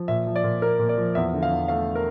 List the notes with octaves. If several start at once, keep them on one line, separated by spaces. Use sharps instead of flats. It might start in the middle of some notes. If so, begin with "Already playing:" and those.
Already playing: F3
A#2 E5
F3
D5
A#2
A#3 A#4
A#2
D5
F3
E2 E5
D3
F5
E2
A3 F5
A#4